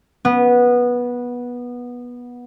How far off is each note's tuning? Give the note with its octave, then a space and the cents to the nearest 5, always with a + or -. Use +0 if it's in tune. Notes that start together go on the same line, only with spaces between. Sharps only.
B3 -15